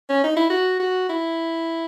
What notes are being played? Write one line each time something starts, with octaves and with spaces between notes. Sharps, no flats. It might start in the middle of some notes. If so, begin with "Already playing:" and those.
C#4
D#4
E4
F#4
F#4
E4